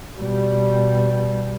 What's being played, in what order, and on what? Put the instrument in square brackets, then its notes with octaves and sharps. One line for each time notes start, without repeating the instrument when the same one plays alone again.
[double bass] B2 G3